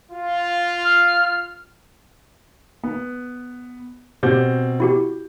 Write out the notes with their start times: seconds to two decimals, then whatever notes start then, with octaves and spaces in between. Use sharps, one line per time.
0.12 F4
0.85 F6
2.84 B3
4.23 B2 C4 G4 G6
4.80 E4 F#4 G4